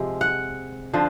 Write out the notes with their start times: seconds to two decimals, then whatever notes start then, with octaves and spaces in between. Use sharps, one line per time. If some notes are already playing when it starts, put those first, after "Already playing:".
Already playing: C3 F3 G#3
0.21 F#5
0.93 D3 F3